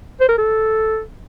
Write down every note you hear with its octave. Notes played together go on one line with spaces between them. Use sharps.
C5
A#4
A4